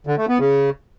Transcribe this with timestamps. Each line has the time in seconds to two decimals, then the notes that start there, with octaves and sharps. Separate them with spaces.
0.07 D3
0.18 A3
0.29 B3
0.40 C#3